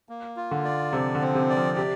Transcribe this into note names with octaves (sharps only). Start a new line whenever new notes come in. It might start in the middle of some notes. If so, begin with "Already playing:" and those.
A#3
F4
D3
D5
C3 F3
D3
C4
C3
D5
F3
C3 G4